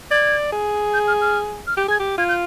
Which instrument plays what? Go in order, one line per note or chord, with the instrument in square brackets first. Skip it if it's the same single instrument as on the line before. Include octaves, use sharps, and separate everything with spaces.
[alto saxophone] D5 [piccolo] G#6
[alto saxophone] G#4
[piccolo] G6
F6
F6
F6
[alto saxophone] G4 [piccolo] G6
[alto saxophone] G#4 [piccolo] G#6
[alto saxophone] G4
[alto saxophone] F4 [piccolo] G#6
[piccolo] G6